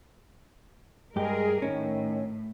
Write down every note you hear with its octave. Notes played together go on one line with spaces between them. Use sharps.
G2 G#3 G4 G#4 A#4
A2 D#3 C#4